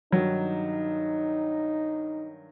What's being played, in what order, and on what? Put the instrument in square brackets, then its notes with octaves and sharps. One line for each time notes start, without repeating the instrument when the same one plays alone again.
[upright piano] G2 D#3 F#3 [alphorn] D#4